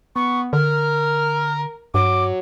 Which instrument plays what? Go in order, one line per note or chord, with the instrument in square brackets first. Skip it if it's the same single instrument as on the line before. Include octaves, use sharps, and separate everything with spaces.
[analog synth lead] B3 [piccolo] C#6
[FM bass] D3 [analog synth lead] A#4 [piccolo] F6
[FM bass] G2 [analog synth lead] F#3 [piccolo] D6